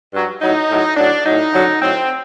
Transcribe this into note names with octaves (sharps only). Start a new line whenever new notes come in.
G2 F#3
A2 F#3 D#4
A2 F#3
A2 F#3 D4
A2 F#3 D#4
F#2 D3 F#3
A2 F#3 C4